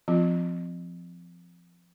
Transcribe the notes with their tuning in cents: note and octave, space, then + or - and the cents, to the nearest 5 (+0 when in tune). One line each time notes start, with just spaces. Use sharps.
F3 +0 C4 -30 F4 +0